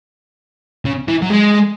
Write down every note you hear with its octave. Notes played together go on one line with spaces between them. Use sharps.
C#3
E3
F#3
G#3